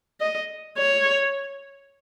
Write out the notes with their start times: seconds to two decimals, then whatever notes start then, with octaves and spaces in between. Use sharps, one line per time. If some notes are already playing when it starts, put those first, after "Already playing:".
0.21 D#5
0.77 C#5